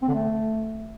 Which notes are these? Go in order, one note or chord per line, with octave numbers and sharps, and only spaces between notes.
C4
D3
A3